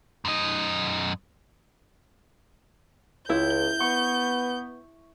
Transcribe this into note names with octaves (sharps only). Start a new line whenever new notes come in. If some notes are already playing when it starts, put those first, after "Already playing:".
F#2 D#5
C#2 E4 G6
B3 C#6